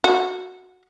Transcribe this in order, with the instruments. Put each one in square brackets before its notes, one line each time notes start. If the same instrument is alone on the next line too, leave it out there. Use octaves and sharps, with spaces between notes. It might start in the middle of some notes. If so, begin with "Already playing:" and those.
[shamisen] F#4